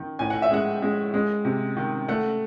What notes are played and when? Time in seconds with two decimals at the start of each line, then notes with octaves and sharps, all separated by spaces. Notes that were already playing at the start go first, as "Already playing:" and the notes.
Already playing: D#3
0.19 A2 G#5
0.30 F#5
0.42 E5
0.51 G#3 F#5
0.82 G#3
1.14 G#3
1.45 C3
1.77 D#3
2.08 A3 F#5